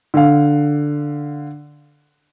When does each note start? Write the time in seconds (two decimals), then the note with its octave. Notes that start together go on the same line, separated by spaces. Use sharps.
0.14 D3 F5